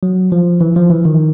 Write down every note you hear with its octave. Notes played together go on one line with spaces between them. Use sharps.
F#3
F3
E3
F3
E3
D#3